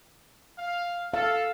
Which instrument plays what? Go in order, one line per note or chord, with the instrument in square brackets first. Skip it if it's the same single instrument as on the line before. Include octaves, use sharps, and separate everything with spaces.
[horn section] F5
[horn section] A4 [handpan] F5